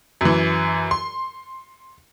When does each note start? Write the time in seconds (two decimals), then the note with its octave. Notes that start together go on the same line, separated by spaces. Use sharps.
0.21 F#2 E3
0.91 C6